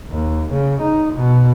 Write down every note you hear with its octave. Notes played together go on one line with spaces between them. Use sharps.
D#2
C#3
D#4
B2